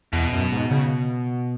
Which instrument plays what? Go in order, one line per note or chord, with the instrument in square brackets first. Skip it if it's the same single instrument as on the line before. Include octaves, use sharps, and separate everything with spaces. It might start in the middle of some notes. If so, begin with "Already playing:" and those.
[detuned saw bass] E2 [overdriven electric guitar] B2
[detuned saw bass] F#2
G#2
C#3